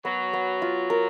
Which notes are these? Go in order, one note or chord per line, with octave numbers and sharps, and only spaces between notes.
F#3 B3
B3
F4
A#4